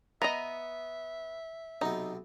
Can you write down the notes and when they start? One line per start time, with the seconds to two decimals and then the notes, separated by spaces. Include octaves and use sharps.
0.22 B3 D#5 E5 A#5
1.81 B1 C3 B3 D#4